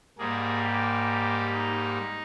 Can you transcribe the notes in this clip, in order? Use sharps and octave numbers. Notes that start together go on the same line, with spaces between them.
G#2 G3 A#3 G#4
G4
D#4